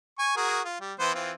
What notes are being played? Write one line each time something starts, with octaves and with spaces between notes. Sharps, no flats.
G#5 C#6
F#4 G#4 A#4
F4
G3
E3 B3 C5
E3 C4 F4